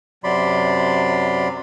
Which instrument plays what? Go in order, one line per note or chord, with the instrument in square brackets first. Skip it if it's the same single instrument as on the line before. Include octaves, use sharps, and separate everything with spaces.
[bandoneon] F#2 C3 F#3 D5 B5 C6